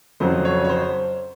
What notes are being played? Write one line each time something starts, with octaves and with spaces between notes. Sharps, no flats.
F2 C#3 F#3 C5
C#5
C#5
C5